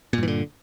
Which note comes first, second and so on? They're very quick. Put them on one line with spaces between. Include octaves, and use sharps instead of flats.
A#2 G2 E3 D3